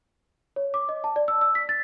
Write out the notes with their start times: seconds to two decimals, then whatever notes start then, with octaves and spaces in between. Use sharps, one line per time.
0.56 C#5
0.74 D6
0.89 D#5
1.04 A5
1.16 D5
1.28 E6
1.41 E6
1.55 B6
1.69 A6